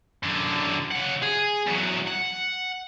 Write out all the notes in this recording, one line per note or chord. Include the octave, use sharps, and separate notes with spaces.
F#2 D3
C#3 F#5
G#4
E2 F#3
F#5